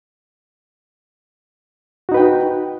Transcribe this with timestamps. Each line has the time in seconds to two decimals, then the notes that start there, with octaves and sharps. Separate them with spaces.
2.09 F#4
2.12 D#4
2.14 B4
2.17 G5